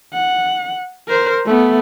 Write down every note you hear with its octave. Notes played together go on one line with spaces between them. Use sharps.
F#5
A#4 C5
A3 B3